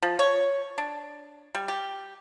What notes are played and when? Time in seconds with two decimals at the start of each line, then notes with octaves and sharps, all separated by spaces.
0.02 F3
0.19 C#5
0.78 D4
1.55 G3
1.68 G4